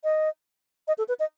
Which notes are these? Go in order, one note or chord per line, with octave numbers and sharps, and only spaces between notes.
D#5
D#5
A4
B4
D#5